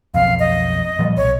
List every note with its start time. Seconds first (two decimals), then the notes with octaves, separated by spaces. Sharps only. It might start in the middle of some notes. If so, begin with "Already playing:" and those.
0.14 B1 F2 F5
0.39 D#5
0.99 A#2 F3 G3
1.17 B1 C#5